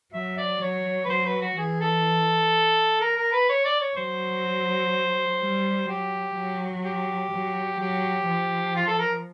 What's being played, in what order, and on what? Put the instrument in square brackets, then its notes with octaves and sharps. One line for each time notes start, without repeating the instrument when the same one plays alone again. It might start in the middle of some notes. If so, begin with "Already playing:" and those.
[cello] F#3 [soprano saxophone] E5
[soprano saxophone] D5
[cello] F#3 [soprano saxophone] C#5
[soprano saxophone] B4
[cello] F#3 [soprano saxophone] C5
[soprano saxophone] B4
F#4
[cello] E3 [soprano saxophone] G#4
[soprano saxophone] A4
A#4
A#4
B4
C#5
D5
C#5
[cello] F#3 [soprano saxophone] C5
[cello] G3
[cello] F#3 [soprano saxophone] G4
[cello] F#3
[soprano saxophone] G4
[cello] F#3
[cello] F#3 [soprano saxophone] G4
[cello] F3
[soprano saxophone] F4
A4
A#4